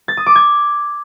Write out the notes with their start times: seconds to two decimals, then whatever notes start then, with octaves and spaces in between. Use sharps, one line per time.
0.08 A6
0.17 D#6
0.26 D6
0.36 G#6